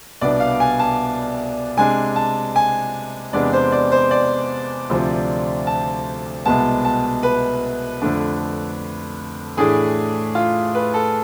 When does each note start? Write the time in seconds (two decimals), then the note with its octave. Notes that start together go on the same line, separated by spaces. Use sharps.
0.21 C2 B2 B3 D4 D5
0.40 F5
0.60 G#5
0.79 A5
1.77 C3 G#3 D4 G#5
2.16 A5
2.56 G#5
3.33 E2 C3 G#3 B3 D4 D5
3.53 C5
3.72 D5
3.92 C5
4.11 D5
4.89 D2 C3 F3
5.67 A5
6.46 C2 B2 G#3 B3 A5
6.85 A5
7.23 B4
8.02 F2 D3 A3 D4
9.57 A2 E3 A3 D4 G#4
10.35 F4
10.75 B4
10.94 A4